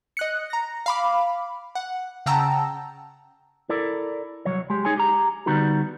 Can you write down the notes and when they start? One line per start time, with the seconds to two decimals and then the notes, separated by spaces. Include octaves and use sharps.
0.17 D#5 F#6 C#7
0.50 A#5 A#6
0.86 F5 B5 D6
1.75 F#5
2.26 C#3 F#5 G5 A5 A#5 E6
3.69 E4 A4 A#4 D5
4.45 C2 F#3 C#5
4.70 G#3 G4
4.85 D#4 G#4 C#5 G#5
4.97 G4 A#5
5.46 D3 G3 B3 D#4 F#4